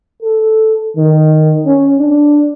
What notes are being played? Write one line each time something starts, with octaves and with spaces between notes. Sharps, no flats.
A4
D#3
C#4
D4